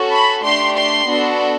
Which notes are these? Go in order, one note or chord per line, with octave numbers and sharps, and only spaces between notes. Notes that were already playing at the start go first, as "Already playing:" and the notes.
Already playing: C#4 F#4 A4
B5
A3 D4 G4 C6
C6
B3 D4 F#4 A4